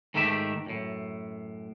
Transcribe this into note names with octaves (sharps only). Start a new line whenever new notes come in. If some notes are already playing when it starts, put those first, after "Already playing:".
G#2 D#3 A3 E4 G4 E5
F#2 A2